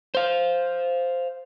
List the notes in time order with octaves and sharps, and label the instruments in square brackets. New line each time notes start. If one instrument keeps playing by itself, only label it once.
[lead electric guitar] C5 F5